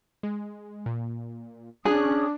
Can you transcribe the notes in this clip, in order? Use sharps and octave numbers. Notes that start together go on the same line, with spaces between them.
G#3
A#2
C#4 D4 G#4 D#6 F#6